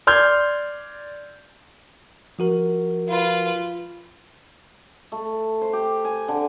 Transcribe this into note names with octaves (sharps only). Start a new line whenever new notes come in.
D5 C6 F6 G6 G#6
F3 F#4 A#4
F4 B4
A3
C5
G4
G#5
D3